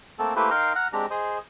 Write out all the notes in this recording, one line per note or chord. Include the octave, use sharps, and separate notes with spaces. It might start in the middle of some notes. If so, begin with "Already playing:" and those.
A3 A#3 C4 A4
A3 A#3 E4 G4 B4 C5
D#4 A#4 F5 G5 A#5 C6
F#5 A#5 F6
G#3 C4 D4 G4 A#5
G#4 C5 D#5